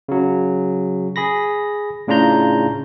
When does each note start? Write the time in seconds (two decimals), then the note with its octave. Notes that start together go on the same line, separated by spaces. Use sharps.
0.09 C#3 F#3
1.16 G#4 B5 A#6
2.07 A2 C#3 D4 F4 A#5 G6